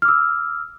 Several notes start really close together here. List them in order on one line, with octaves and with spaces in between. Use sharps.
F6 D6 E6